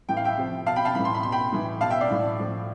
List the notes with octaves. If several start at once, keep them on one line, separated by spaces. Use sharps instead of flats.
A2 E3 G5
F5
E5 G5
C3 F3
B2 F5 A5
G5 B5
F5 A5
A2 E3 B5
C6
B5
B2 C6
G5 B5
A2 E3
B2 F5 A5
E5 G5
D5 F5
A2 E3
A2 F3